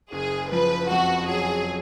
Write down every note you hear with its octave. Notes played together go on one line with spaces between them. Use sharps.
F#1 G#4
F3 B4
F2 F#4
F#3 G#4